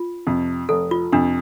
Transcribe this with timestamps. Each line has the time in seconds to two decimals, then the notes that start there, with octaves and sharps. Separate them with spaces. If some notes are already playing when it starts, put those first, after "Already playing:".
Already playing: F4
0.27 F2 C3
0.69 F1 A4
0.91 F4
1.13 F2 C3 D4